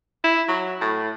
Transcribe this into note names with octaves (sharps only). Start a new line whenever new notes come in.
E4
F#3
A2